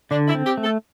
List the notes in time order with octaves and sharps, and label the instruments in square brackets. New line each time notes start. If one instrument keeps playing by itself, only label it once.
[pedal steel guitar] D3 [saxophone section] D4
[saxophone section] E4
[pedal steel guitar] C4
[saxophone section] G4
[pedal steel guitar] A3
[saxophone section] A4